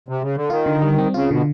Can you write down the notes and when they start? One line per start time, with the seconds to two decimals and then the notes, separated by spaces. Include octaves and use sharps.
0.08 C3
0.22 C#3
0.36 D3
0.50 D#3 F4
0.66 D3
0.82 G3
0.98 C4
1.14 C#3 F4
1.31 B2 D3